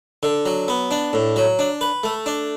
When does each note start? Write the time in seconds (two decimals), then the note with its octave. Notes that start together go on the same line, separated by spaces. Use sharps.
0.23 D3
0.46 F#3
0.68 B3
0.91 D4
1.13 A2
1.36 F#3
1.59 D4
1.81 B4
2.04 A3
2.26 D4